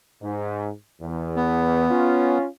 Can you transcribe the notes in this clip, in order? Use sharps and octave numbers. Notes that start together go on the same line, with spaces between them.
G#2
E2
B3
C#4 F4